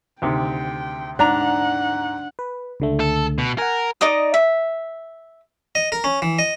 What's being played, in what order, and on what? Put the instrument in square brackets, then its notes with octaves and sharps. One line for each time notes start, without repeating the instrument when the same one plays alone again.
[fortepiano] D2 C3 D#3 [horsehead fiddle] G5
[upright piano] G#2 A#5 F7 [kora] D4 [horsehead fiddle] F#5
[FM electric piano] B4
C#2 D3 A3
[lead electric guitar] A4
B2
[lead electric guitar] A#4 [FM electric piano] F#5 G#5
[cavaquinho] D#4 D5 D#5 D#6
E5
[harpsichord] D#5
A#4
C#4
E3
D#5